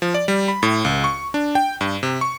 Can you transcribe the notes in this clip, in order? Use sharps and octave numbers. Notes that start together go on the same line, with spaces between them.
F3
D5
G3
B5
A2
C#2
C#6
D4
G5
G2
C3
C#6